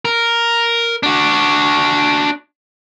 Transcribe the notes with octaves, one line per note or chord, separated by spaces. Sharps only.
A#4
D4 F#4